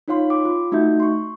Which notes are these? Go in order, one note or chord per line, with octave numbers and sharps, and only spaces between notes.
D#4 F4 C#5 F5 C6
G5 D6
F4
A3 D#4 F#4 E5 G6
C6 C#6